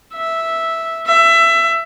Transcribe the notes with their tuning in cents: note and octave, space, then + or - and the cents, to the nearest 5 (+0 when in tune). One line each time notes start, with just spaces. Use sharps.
E5 -5
E5 +20